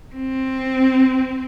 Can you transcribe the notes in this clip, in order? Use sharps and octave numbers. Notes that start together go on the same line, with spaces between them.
C4